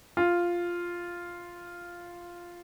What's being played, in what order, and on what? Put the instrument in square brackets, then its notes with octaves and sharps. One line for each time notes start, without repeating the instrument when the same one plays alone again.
[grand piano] F4